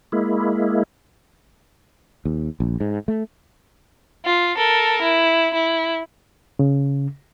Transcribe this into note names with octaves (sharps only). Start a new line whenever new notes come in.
G#3 A#3 E4
D#2
A#1
G#2
A3
F4
A4 A#4
E4
E4
C#3